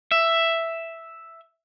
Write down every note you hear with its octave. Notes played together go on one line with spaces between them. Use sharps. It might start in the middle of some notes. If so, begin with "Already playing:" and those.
E5